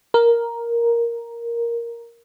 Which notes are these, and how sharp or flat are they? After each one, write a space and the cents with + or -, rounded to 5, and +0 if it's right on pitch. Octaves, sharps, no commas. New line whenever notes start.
A#4 +5